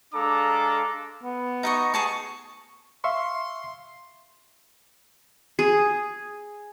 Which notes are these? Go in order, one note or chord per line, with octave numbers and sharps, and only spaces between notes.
G#3 D4 A4 F5 A#5 D6
B3
D#4 D#5 C#6
G#4 A5 C#6
E5 F5 C6 C#6
G#4